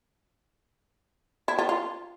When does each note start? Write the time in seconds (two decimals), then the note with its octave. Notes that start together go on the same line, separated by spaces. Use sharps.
1.48 E4
1.59 F4
1.69 F4